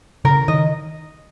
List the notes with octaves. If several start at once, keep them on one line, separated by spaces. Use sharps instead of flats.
C#3 A#4
D#3 D#5